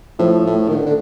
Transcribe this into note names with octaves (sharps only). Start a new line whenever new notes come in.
A2 F3
A2
D#3
D3
D3